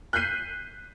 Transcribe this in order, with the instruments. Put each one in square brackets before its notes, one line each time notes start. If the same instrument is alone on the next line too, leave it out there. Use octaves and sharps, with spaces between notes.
[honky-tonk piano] F#6 G6 B6 C7 D#7